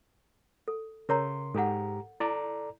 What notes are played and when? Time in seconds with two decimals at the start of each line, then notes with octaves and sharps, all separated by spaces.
0.68 A4
1.09 C#3 A#4 C#5 A#5 C6
1.55 G#2 G4 A4 F#5 A#5
2.20 E4 A4 D5 A#5